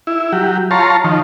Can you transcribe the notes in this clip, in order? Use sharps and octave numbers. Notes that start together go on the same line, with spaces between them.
E4
F#3 G4
F4 C#5 A5 A#5 C6
D#3 F3